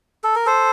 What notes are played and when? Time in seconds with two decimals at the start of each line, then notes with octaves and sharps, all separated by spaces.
0.24 A4
0.35 A#4
0.46 A4 C5